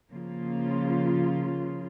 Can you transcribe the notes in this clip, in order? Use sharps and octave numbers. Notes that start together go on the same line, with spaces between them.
C#3 F3 A#3 F4